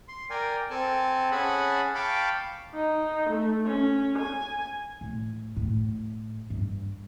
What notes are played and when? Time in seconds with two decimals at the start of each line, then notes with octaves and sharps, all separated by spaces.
0.08 C6
0.30 A#4 D5 G5 G#5
0.70 C4 A4 G#5 A5
1.31 C#4 G#4 F#5 G#5 A5 B5
1.95 F5 G5 A5 B5 C#6 D6
2.75 D#4
3.30 A3
3.66 C#4
4.18 G#5
5.01 A2
5.56 A2
6.50 G2